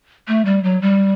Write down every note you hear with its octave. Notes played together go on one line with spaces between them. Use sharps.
A3
G3
F#3
G3